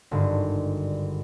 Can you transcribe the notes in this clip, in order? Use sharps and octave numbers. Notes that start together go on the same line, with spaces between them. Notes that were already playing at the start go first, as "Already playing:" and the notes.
G#1 G2 D3